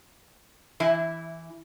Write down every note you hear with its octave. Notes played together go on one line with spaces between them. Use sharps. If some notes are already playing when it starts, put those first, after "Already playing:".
E3 E4